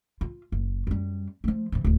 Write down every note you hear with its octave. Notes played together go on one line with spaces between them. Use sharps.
F4
F#1
F#2 G3
F3 A3
G#2 E3
D1 D#2